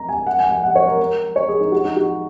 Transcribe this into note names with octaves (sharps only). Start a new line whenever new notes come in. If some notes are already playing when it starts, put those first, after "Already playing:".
Already playing: A#5
G#5
F#5
G#5
G#5
F#5
C#5
A#4
A#4
C#5
G#4
D#4
F#4
D#4
F#4